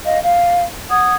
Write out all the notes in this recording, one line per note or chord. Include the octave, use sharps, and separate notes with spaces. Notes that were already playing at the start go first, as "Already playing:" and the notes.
D#5 F5
F5
F#5 D#6 G#6